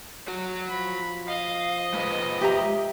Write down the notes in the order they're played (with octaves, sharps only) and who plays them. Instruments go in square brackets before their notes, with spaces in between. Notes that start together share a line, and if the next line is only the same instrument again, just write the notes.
[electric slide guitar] F#4 C#5
[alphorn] F3 [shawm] B5
[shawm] D#5 [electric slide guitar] F5
[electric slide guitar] G#3 A#4 B4
[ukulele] G4 E5 A#5